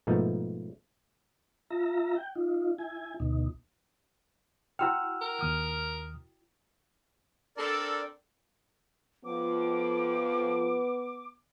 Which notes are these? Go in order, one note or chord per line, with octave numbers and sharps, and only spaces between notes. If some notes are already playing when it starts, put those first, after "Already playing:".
G#2 B2 F3 A3 A#3 D#4
F4 E5 A#5
G5
D#4 F4
E4 G#5
D2 B2 D#4
E4 F#4 F#5 G5 E6 F6
A#4
D#2 D#6 F6
C4 D4 A4 A#4 D5
F2 F3 B3 D6